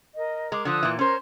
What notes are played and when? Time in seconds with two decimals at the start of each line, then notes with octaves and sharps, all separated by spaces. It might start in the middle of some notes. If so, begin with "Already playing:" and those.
0.16 A#4 D#5
0.52 G#3 A#4 D6
0.65 D3 F3 D#6 E6 F#6
0.83 A#2 E3
0.99 C#4 A#4 C5 C6